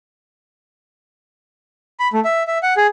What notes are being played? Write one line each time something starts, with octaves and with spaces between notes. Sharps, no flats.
B5
A3
E5
E5
F#5
G#4